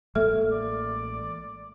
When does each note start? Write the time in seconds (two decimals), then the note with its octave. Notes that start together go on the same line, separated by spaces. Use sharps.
0.15 A1 G#3 A#3 A4 E5 F6
0.52 D5